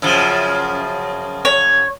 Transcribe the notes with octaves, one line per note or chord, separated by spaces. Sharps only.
F#2 C#3 F3
C#5